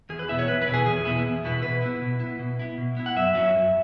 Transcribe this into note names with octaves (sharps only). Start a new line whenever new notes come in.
E2 G#4
B4
B2 B3 E4 E5
C#5
E2 B4
B4
B2 B3 E4
G#4
E2 G#4
B2 B3 E4
E2
B2 B3 E4
B2 B4
B3 E4
B2
B3 E4
B2
B3 E4
B2
B3 E4
F#5
F#2 E5
F#3 C#4
F#2